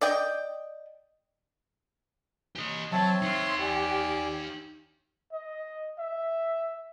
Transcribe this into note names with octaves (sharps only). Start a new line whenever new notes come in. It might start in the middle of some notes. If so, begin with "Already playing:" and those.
D5 D#5 G5
G4 D#5
F#3 C4 C#5 E5 A5
D#4 F5 C6
G4 D5 G#5
D#5
E5